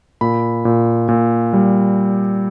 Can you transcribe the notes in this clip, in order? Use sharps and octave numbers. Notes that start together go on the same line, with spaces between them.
A#2 B5
A#2
A#2
G3